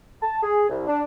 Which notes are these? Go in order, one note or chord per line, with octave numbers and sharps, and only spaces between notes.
A5
G#4
C2
D4